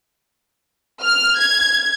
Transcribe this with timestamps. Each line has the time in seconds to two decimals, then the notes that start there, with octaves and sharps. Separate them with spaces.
1.02 F6
1.38 G#6